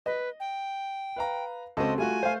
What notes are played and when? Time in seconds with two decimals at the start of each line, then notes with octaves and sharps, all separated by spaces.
0.06 B4 D#5
0.40 G5
1.16 B4 F5 A#5
1.77 C#2 C4 F#4 A4 D#5
1.98 G3 A3 F4 F#4 G#5
2.23 A3 C5 F5